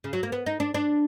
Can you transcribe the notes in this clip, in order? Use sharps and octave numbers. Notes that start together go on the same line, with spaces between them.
C#3
F#3
A#3
B3
D#4
D4
D4